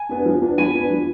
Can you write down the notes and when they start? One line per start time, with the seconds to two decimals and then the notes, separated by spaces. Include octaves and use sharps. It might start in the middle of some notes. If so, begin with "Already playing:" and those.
Already playing: G#5
0.09 B3 D4
0.25 F3
0.42 B3 D4
0.58 F3 G#5 B5
0.74 B3 D4
0.90 F3